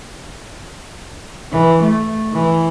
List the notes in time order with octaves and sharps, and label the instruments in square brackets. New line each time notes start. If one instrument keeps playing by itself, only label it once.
[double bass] E3
A3
E3